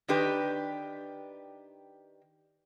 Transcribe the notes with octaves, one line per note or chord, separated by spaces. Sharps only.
D#3 D4 G4 B4